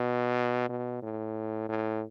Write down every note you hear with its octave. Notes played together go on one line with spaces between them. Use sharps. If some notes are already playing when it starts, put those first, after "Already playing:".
Already playing: B2
B2
A2
A2